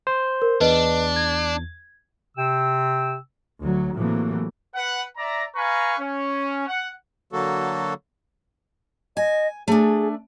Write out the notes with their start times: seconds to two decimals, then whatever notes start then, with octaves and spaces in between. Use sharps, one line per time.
0.07 C5
0.42 A#4
0.61 E2 D4 B4 D#5
1.16 G#6
2.37 C3 G5 E6
3.62 D2 F#3
3.96 A2 C3 E3 F#3 A3 A#3
4.75 B4 F#5
5.16 D5 E5 A#5
5.55 B4 F5 G#5 A#5 C#6
5.99 C#4
6.67 F#5
7.33 D3 F#3 A#3 F#4 A4
9.17 D#5 G#5
9.68 A3 D4 G#4